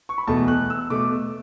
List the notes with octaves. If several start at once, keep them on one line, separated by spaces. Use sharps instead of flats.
C#6
B5
E2 B2 A3 A5
F#6
E6
B2 A3 D6